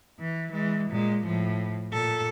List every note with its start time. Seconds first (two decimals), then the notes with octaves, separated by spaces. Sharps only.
0.20 E3
0.51 E3 G#3
0.90 A#2 G#3
1.25 A2 F3
1.93 A#2 A4